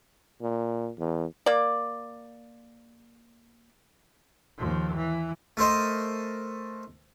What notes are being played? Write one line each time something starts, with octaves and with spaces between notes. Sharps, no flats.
A#2
E2
A#3 D5
D#2 F3
E3
A3 A#4 C5 D#5